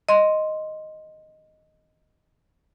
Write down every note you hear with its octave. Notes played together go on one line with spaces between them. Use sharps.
D#5 C6